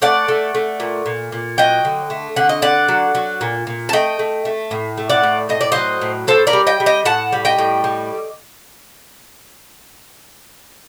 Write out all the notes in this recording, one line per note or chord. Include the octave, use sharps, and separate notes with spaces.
A3 D5 F#5
A3
A3
A#2
A#2
A#2
F#3 D#5 G5
D3
A3
D3 F#5
D#5
D3 D5 F#5
F#3
F#3
A#2
A#2
A5
A3 D#5 G5
A3
A3
A2
A3
D5 F#5
A2
A2 D#5
D5
F#3 C5 D#5
A2
A2 A4 C5
A#4 D5
G3
D#5 G5
G3
D#5 G5
A2 F#5 A5
G3
D#5 G5
A2
G3